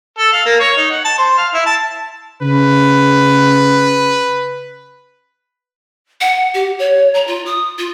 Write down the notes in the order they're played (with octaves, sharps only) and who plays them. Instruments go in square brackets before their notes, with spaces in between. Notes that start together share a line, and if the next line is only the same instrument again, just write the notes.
[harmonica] A4
F5
A#3
C#5
D#4
F#5
A5
C5
F5
E4
A5
[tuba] C#3 [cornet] B4
[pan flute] F#5
G4
C#5
A#5
F4
D#6
F4